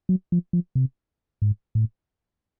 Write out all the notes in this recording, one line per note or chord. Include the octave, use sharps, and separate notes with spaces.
F#3
F3
F3
C3
G#2
A2